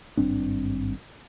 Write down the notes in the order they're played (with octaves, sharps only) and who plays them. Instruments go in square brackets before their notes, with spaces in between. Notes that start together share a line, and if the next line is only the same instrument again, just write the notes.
[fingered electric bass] G#1 G2 C4 D4